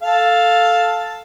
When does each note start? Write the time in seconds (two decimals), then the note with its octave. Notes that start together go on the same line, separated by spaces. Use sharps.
0.02 A4 F5